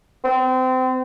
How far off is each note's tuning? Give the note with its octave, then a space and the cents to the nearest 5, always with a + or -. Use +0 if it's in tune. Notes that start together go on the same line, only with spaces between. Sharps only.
C4 -30